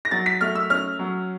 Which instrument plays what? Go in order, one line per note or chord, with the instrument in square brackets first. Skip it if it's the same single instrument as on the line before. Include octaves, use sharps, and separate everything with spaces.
[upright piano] A#6
F#3 A6
B6
A3 F6
E6
C#4 F6
F#3